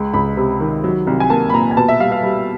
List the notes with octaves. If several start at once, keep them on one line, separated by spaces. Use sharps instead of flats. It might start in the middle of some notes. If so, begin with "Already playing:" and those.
Already playing: C#2 G#3
C#2 B5
C3
D#3
F#3
C2
G#5
A#3 A5
B5
A#2 A#5
G#5
B2 A5
E5
G3 F5
F5
G3